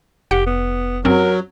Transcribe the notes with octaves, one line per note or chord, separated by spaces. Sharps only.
F1 G4 F#5
B3
F#2 F#3 C4 C#4 A#4